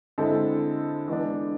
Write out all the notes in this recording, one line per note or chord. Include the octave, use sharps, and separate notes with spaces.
D3 G#3 C4 E4 A4
E3 G#3 B3 D4